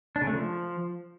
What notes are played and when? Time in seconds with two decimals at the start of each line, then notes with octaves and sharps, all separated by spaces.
0.16 D4
0.21 C#3
0.27 A3
0.33 F3